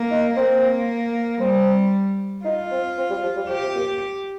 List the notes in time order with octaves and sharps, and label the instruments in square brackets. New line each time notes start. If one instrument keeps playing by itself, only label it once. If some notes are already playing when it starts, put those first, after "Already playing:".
Already playing: [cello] A#3
[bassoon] D#4
[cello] A#3 [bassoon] C4
[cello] G3 [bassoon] C4
[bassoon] D#4 [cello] F4
[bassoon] C4
C4
G3
F3
G3
[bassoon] F3 [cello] G4
[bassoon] C3
A#2